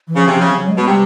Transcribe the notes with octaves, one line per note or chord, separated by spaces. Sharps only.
E3
C#3 F3
C3 F3
C#3
F#3
G#3
B2
C3 G3